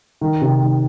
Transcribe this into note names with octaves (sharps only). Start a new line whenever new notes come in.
D#3
C3
D#3